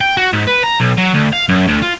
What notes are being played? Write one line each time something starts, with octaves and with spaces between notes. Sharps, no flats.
G5
F#4
G#2
B4
A#5
B1
F#3
D2
F5
F#2
D2
F4